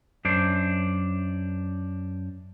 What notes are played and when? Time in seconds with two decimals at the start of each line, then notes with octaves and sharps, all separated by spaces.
0.25 F#2 D4 C5